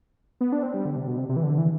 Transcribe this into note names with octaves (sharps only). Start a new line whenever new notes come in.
B3
D4
C4
G3
D3
C3
B2
C3
C3
E3
D3
E3